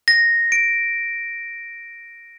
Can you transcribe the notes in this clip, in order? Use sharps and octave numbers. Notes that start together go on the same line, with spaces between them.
A#6
D7